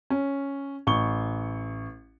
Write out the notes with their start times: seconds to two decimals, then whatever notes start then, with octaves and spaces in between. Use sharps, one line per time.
0.10 C#4
0.87 A1 C#6 G7